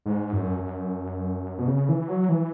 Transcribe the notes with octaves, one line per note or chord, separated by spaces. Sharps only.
G#2
F#2
F#2
B2
C#3
E3
F#3
E3